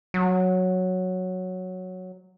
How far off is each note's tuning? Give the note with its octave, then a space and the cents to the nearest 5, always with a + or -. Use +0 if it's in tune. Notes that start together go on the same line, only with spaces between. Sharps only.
F#3 -5